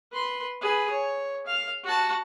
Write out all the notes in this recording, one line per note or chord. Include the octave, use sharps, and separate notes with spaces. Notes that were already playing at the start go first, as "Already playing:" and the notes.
B4 C6
G#4 B4
C#5
F5
F#4 A5